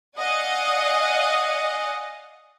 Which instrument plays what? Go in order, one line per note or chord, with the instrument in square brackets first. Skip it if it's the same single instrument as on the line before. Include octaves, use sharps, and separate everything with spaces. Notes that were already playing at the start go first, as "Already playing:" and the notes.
[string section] D5 D#5 F5 F#5 G#5